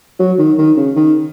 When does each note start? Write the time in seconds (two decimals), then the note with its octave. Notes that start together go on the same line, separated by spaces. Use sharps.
0.19 F#3
0.38 D#3
0.58 D#3
0.77 C#3
0.96 D#3